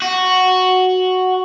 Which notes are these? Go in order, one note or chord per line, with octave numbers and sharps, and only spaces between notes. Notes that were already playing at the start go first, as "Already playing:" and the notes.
F#4